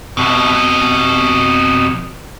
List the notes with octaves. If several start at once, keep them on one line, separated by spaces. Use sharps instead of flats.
F2 B2